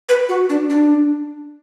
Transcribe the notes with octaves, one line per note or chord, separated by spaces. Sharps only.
B4
F#4
D4
D4